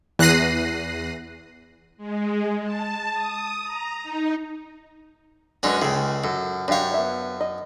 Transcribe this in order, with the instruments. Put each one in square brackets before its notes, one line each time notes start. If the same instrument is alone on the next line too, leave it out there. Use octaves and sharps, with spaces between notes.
[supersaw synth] E2 F#6 A#6 C7 D#7
[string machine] G#3
A5
D#6
A#5
D#4
[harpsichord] F#2 G#3 C#4 [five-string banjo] D4 A4 B4
[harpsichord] C#2 C#3 [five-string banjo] G#4 A4 G5
[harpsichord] F#2 [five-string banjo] A4
[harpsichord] F#2 C#5 [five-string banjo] D4 G4 F5
[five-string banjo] B3 E5
D#5